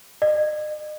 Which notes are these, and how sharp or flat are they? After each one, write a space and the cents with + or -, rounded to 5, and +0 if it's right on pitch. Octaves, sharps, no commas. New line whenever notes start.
D#5 -40